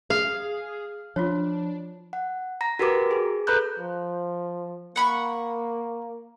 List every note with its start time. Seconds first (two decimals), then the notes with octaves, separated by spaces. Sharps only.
0.10 G#4 F5
1.16 F3 D4 F4 F#4 C#5
2.13 F#5
2.61 A#5 A#6
2.79 F#4 G4 A#4 B4 A#5 D6
3.11 G#4
3.47 A4 B4 A#5 B5 F#6 G6
3.79 F3
4.96 A#3 F#5 B5 C#6